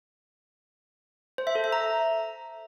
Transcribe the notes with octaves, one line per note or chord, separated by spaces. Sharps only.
C5
E5
A4
E5
A#5